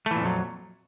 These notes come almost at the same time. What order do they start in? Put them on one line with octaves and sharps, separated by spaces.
A3 E3 A#2 F2 F#3